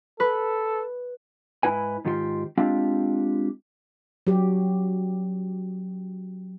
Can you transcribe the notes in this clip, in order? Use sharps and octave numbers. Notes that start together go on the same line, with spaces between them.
A4 B4
G#2 E4 B4 G#5
G#2 D#3 F4 G4 G#4 C6
G#3 C4 D4 F4 G4 F5
F#3 G4